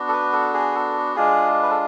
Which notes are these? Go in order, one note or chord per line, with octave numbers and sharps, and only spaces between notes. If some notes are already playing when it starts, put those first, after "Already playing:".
Already playing: B3 D4 F#4
A4
B4
A4
G#4
A4
G#3 D4 F4 G#4
B4
A4